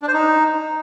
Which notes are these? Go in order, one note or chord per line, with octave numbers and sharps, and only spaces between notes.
D4
C5
D#4